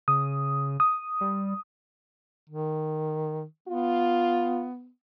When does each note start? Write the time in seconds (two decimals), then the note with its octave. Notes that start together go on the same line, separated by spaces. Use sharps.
0.08 C#3 D#6
0.80 D#6
1.21 G3
2.50 D#3
3.68 B3 F4